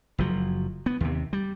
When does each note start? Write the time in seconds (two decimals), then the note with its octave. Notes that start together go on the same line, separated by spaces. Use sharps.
0.18 F#1 F3 F#3
0.86 B3
1.01 D#2 C3
1.33 G3